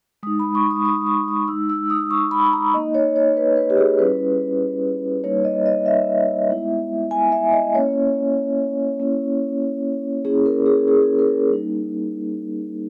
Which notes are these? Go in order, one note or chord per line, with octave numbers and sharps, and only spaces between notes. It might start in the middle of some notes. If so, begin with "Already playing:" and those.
G#3 D#4 D#6
B5
C#6
D#6
D#6
C#6
D#6
G#3 D#4 E6
E6
D#6
C#6
B5
A#5
A#3 D#4 D#5
C#5
C#5
B4
B4
G4
G#4
G3 C#4 E4 B4
G3 A#3 D#4 C#5
D#5
D#5
E5
G#3 B3 E4
G#5
E5
D#5
A#3 C#4 E4 C#5
A#3 C#4 E4
A#3 C#4 E4 G#4
A#4
G#4
G#4
G#4
A#4
G3 A#3 D#4